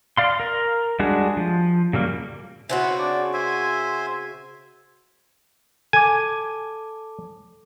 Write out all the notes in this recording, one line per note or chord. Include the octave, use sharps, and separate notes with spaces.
D5 F5 C6
A#4
G3 G#3 D4 F#4 G#4
F3
C#3 F#3 G3 A#3
C#3 B3 C4 E4 F#4
D4 D5
C5 E5 G#5
A4 G#5 D6